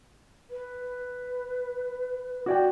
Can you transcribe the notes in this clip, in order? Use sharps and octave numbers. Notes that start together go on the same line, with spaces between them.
B4
F#4 D5 G5